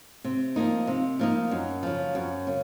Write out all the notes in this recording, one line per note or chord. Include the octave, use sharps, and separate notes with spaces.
C3
F3 A#3 D#4
C3
F3 A#3 D#4
F#2
C#3 F3
F#2
C#3